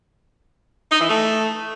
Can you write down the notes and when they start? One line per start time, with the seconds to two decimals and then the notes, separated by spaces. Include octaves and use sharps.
0.92 D#4
1.01 E3
1.10 A3